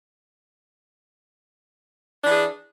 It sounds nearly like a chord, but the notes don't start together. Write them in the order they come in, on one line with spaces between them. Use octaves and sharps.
D4 E3 G#4